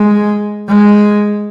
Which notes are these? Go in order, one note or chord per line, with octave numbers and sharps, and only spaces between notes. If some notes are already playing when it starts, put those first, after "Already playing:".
Already playing: G#3
G#3